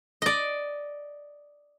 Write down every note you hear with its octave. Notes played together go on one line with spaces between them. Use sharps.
D5 D#5